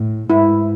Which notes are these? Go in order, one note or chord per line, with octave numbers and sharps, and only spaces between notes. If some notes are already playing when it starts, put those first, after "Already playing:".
Already playing: A2
G#2 E4